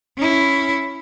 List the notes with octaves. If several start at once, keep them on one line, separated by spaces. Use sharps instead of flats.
C#4 E4